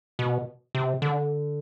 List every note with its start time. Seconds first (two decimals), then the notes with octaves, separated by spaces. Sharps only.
0.19 B2
0.75 C3
1.02 D3